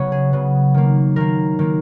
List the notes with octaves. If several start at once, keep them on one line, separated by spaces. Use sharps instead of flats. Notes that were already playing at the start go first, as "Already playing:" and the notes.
Already playing: C#3 F#3 B3 B4 C#5
G#4
C#3 F#3 B3
D#3 A#3
D#3 A#3 A#4
D#3 A#3